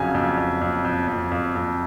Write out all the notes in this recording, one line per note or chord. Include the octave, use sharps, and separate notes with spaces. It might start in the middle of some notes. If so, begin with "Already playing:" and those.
Already playing: F2 C#3 F#3 G#5
F2
F2
F2
F2
F2
F2
F2